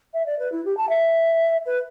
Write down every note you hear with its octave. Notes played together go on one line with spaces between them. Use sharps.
E5
D5
B4
E4
G4
A5
E5
B4